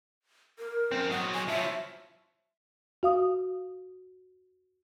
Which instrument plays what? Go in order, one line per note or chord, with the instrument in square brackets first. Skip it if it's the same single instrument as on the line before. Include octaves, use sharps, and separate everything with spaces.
[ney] A#4
[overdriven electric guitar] F#2 C4
[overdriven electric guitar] F#3 D#5 [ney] F#5
[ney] G#5
[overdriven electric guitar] F3 F#3 [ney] E5
[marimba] F#4 F5 D#6